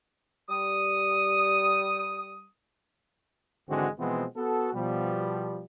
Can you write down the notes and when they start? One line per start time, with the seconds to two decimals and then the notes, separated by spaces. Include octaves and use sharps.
0.49 G3 D#6
3.69 G#1 D3 E3 G#3 C4 F#4
3.99 B2 E3 F3 G#3 B3 C4
4.37 B3 F#4 A4
4.74 B2 F3 G3